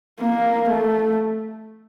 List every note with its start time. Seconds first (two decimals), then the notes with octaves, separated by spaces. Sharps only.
0.20 A#3
0.69 A3